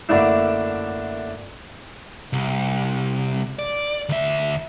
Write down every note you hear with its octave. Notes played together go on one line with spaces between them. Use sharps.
F#2 D3 A3 A#3 D4 E4
C2
D5
D2 E5